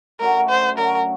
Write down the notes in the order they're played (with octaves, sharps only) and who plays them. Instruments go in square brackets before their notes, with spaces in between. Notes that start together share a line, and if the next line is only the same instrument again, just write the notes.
[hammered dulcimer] F#2 D3 F#3 A3 [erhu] A#4
[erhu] C5
[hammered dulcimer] F#2 D3 F#3 A3 [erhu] A#4